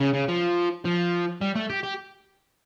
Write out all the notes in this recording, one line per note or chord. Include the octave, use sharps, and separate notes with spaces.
C#3
C#3
F3
F3
G3
A3
G4
G4